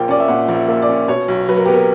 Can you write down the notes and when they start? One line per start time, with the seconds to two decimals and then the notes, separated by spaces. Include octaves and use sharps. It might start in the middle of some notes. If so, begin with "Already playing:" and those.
Already playing: A#1 A#2 A#3 G5
0.08 C#4 D5
0.20 E5
0.28 A#2 F#5
0.48 A#1
0.55 E5
0.68 A#3 E5
0.82 D5
0.89 C#4
1.08 B2 C#5
1.28 B1
1.48 F#3 B4
1.57 A#4
1.65 B3 G4
1.74 A#4